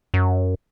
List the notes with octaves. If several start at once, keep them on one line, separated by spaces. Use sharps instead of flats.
F#2